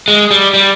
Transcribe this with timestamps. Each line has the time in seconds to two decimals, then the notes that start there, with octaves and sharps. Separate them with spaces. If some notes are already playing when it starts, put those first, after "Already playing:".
0.08 G#3
0.31 G3
0.54 G3